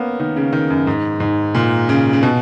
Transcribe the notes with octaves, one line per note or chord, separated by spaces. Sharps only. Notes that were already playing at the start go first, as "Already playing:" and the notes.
Already playing: A#3 B3 C#4
D#3
C#3
D#3
F#2
G#2
G#2
A#2
C#3
C#3
B2